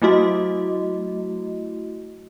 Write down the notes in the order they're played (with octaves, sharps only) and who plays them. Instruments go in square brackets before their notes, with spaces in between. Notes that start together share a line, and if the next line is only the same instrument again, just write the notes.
[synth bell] F#3 A3 E4 F#4 D#5